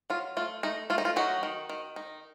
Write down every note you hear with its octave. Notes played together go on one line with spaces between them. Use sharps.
F#3 F4
A3 F4
A3 D#4
A3 F4
D#4
F4
F#3 D#4 F#4
D#3
D#3
D#4